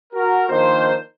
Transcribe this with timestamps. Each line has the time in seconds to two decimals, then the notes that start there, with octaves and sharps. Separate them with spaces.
0.13 F#4 A#4
0.49 D#3 F3 A#3 D4 D#4 C5